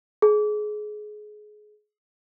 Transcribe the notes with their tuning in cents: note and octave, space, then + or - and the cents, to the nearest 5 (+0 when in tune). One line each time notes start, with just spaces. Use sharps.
G#4 +25